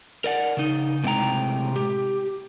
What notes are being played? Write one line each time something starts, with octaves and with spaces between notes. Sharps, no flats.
A#4 D5 F#5
C#3 D#4
A2 C3 G#3 G5 A#5
G4